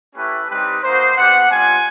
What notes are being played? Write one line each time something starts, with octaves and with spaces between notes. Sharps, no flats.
A3 C#4 E4 G4 B4
G3 C4 D#4 G4 B4
A#3 D#4 F#4 C5
B3 D4 G4 F#5
G3 C4 F4 G#5